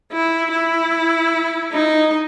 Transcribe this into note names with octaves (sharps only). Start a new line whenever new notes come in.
E4
E4
D#4